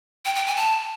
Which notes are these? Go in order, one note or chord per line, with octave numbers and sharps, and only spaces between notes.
G5
G5
G#5
A5